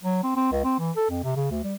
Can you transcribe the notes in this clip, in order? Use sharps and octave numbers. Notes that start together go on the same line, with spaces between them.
F#3
C4
C4
C#2
C4
E3
A4
F2
C3
C#3
D2
G3